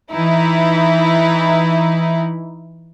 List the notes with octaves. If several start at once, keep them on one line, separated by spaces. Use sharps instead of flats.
E3 D#4 E4